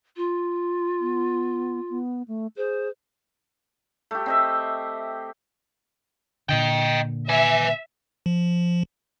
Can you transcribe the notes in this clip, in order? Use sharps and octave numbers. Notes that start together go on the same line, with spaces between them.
F4
B3
B3
A3
G#4 C5
A3 G4
C4 D#5 E5
A#2 D3 D#5 G5
B4 E5 G#5
F3